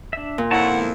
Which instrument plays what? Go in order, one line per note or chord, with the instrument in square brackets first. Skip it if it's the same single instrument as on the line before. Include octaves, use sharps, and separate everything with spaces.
[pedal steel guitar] D4 E5
[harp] A#2
[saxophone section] F2 E4 [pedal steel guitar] D#4 C#5 A5 [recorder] F#5
[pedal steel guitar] D#3 G#3 B3